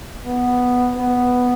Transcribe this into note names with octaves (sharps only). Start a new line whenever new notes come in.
B3
B3